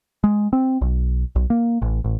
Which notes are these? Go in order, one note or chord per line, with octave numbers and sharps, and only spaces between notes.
G#3
C4
B1
B1
A#3
A1
A1